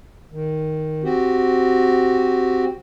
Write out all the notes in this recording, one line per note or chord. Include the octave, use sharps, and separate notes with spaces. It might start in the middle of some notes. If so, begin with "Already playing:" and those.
D#3
C4 F#4 G4